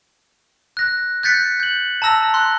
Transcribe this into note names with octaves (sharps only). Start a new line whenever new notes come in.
F#6 A#6
F#6 G6 A6 B6 C#7
G6 F#7
A5 A#5 E6 A#6
C6 F#6